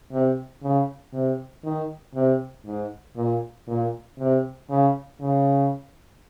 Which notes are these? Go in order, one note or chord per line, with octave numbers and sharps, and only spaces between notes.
C3
C#3
C3
D#3
C3
G#2
A#2
A#2
C3
C#3
C#3